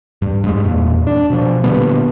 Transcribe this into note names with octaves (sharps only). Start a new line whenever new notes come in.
G2
G2 G#3
E2 A#2
D4
B2 F3
A#2 D3 G3 B3